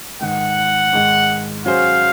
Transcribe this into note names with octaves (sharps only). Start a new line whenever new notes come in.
G#2 D#3 G#3 F#5
G#2 D#3 G#3
F#3 C#4 G#4 C5 F5